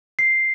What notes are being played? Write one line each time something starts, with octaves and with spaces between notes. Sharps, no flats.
C7